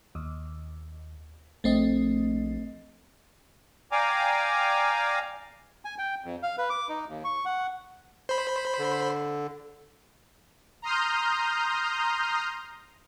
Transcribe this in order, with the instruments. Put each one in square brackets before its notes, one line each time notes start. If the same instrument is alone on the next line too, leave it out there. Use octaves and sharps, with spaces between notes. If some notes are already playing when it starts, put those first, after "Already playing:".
[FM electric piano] D#2
[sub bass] A#1 [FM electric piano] A3 C4 D#5
[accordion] D5 F5 G5 G#5 A#5 D6
[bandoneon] G#5
G5
F2
F5
B4
D6
D#4
D#2
C#6
F#5
[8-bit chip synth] C5 B5
[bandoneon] D3
[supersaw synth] A#5 C6 D#6 F6 G6